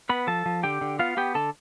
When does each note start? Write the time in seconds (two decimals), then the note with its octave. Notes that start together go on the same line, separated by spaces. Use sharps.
0.09 B3 B4 B5
0.27 F3 A4 A5
0.46 F3
0.63 D3 G4 G5
0.81 D3
0.99 B3 F4 F5
1.17 B3 G4 G5
1.35 D3 A4 A5